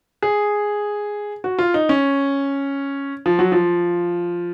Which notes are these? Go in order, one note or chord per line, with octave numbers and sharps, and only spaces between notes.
G#4
F#4
F4
D#4
C#4
F3
F#3
F3